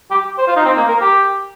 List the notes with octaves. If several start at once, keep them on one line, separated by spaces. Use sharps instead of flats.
G4
C5
F4
D#4
C4
A#3
A#4
G4